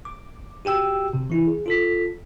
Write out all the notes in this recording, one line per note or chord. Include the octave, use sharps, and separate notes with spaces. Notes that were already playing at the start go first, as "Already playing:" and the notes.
D6
F#4 G4 G5 E6
C3
E3 E4
G#4
F4 A4 B6